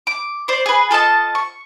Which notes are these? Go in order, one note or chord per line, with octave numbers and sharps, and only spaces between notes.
D6
C5 D5
G#4 B4
F4 A4 D#5 A5
C#6